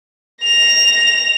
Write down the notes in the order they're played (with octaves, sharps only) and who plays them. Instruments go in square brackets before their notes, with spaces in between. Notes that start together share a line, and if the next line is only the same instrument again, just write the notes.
[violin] A#6 F7